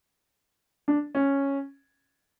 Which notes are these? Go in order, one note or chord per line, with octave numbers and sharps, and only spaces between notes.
D4
C#4